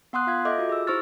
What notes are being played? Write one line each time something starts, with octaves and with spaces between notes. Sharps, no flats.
B3 F#5 C6 D#6 F#6
F4 F5 G#6
A4 D#5 E5 D6 G6
F4 F#4
G#4 E6
E4 C5 C#6 E6 F6 A6